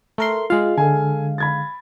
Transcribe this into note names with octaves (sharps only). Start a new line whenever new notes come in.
A3 A#4 C6
G#3 F4 F5
D3 A4 G#5
B5 G#6 A6